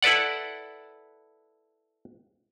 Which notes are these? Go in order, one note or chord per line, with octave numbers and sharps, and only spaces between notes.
E4 A4 B4 D5 F#5